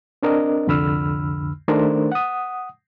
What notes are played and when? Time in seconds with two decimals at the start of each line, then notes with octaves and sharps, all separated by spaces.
0.23 C4 D4 A#4 D#5
0.67 C2 F2 D3 B5 E6 F6
1.68 D#3 A3 D4 A#4 C5
2.12 F#5 D#6